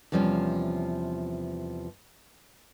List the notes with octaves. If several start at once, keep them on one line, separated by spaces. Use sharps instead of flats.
E2 C3 F3 G3 C#4